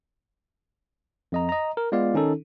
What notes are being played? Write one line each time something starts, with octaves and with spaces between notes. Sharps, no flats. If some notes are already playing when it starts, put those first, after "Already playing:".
F2 D#5 A#5
D#5 A#5
A#4
G#3 B3 F4 D5 F5
D#3 C#4 D#4 A4